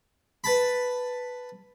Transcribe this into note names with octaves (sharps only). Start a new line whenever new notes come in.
B4 A5 B5